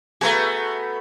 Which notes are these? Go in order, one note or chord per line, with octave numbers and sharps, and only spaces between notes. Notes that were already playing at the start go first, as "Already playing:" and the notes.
A3 B3 F#4 G#4 A#5